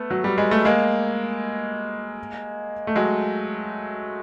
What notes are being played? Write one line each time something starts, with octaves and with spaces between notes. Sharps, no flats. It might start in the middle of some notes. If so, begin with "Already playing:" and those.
Already playing: A3 B3
F#3
G3
G#3
A3
G#3 A#3
A3
F#3 G#3